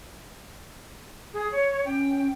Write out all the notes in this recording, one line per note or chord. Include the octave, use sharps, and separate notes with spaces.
G#4
C#5
C#4 G5